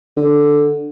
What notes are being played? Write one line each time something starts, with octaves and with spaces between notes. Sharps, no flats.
D3